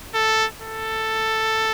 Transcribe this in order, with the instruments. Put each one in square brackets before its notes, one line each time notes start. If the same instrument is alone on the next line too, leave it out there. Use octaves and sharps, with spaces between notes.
[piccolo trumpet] A4
A4